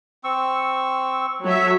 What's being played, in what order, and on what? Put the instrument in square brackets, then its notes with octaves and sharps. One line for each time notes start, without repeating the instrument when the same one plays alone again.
[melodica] C4 C#6 E6
[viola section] F#3 E5 [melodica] A4